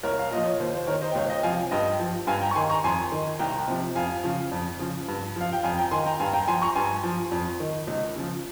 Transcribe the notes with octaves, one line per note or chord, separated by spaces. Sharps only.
C2 A#4 C#5
F5
A#2 F3 D#5
C#5
D#2 C5
C5
D#3 A#4 C#5
C5 D#5
G5
C#2 C#5 F5
D#5 G5
C3 F3 F5 G#5
G2 D#5 G5
F3
G2 F5 G#5
G5 A#5
C#6
D#3 G#5 C6
A#5 C#6
F2 G#5 C6
D#3
C2 G5 A#5
C3 F3
F2 F5 G#5
C#3 F3
F2
C#3 F3
G2
F3 F5
G5
F2 F5 G#5
G5 A#5
D#3 G#5 C6
G5 A#5
G2 F5 G#5
G5 A#5
F3 G#5 C6
A#5 C#6
G2 G#5 C6
F3
F2
D#3
C#2
C#3 F3